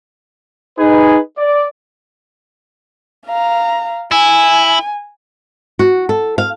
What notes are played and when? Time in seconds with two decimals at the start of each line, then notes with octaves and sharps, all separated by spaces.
0.78 D#4 G#4 B4
1.37 D5
3.26 F5 A#5
4.12 E4 G#5
5.79 F#4
6.09 A4
6.38 F5